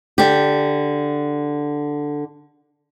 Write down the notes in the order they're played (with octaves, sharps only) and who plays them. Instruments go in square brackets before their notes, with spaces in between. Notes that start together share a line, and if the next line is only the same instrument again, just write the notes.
[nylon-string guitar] D3 G4